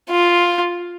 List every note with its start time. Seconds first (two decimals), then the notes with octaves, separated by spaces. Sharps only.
0.10 F4